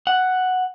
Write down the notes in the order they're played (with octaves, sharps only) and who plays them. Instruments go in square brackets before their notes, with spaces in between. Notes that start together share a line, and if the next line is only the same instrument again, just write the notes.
[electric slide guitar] F#5